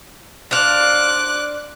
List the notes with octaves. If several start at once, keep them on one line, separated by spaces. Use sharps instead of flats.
D4 C5 F5 D6 F#6